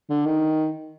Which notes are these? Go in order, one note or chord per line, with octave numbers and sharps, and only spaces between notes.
D3
D#3